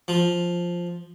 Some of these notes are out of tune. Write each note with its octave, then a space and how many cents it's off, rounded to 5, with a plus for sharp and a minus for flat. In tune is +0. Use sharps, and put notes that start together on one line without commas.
F3 +0